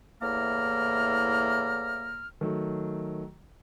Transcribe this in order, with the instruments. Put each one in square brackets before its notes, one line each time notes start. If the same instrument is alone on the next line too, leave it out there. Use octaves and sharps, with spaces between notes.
[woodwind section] E2 A2 A#3 A#5 F6
[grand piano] D#3 F#3 A3